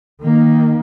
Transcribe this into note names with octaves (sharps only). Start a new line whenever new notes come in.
D#3 A#3